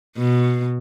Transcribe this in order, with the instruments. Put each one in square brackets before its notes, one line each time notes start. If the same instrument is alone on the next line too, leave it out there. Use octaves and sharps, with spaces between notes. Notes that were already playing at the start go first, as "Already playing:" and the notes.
[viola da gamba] B2